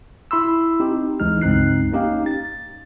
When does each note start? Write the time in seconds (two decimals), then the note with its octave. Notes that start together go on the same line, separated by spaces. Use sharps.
0.31 E4 B5 C6 E6
0.80 C4 D#4 G4
1.20 D2 E3 G#3 D#4 F6
1.41 C#2 G2 C4 D#4 F#6 C7
1.92 A#3 C#4 D#4 G4 F5
2.26 A6